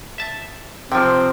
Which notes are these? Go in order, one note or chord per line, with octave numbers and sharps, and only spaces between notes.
E5 A5
C3 F3 C4 G5